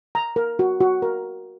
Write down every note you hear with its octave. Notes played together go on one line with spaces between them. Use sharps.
A#5
A#4
F#4
F#4
A#4